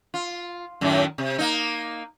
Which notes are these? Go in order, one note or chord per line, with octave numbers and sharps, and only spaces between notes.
F4
F#2 A2 D#3
C3
A#3 D#4